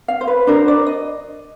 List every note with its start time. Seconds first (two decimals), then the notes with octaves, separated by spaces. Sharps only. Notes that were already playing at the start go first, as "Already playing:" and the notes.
0.08 F5
0.21 C5
0.28 B4
0.47 D4 F#4 A#4 C5
0.68 D5
0.87 D#5